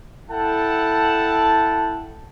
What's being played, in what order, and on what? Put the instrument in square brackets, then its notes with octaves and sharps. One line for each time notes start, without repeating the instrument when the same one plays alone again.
[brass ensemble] E4 A4 F#5 G5 A5